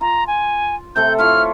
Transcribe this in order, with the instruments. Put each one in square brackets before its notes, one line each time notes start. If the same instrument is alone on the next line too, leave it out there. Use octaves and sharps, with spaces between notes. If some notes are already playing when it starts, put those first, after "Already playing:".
[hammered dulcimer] F4 [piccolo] A#5
[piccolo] G#5
[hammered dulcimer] C3 A3 A4 [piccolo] G6
[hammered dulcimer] E4 F4 C#5 [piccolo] F6